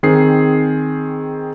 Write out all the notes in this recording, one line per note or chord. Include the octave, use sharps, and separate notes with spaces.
D#3 C4 G#4 C7